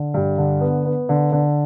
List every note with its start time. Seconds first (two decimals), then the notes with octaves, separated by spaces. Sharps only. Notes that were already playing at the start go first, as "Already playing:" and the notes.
Already playing: D3
0.14 G2
0.38 D3
0.61 B3
0.85 B3
1.09 D3
1.32 D3